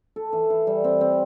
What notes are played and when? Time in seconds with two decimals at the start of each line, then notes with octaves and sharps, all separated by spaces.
0.16 A4
0.33 E3
0.50 E3
0.67 G3
0.84 C4
1.01 C4